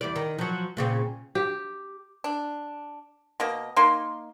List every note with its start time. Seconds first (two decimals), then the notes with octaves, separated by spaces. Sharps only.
0.01 E2 G3 D5
0.16 D#3
0.38 F3 F#3
0.77 A#2 C#3 C4
1.35 G4
2.24 D4
3.40 B2 A#3 D#5
3.76 A#3 D#4 C6